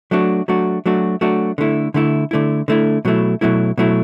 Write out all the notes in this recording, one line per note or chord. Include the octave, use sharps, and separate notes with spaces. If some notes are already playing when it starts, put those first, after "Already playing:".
F#3 A3 D4 F#4
F#3 A3 D4 F#4
F#3 A3 D4 F#4
F#3 A3 D4 F#4
D3 A3 E4
D3 A3 E4
D3 A3 E4
D3 A3 E4
B2 F#3 A3 E4
B2 F#3 A3 E4
B2 F#3 A3 E4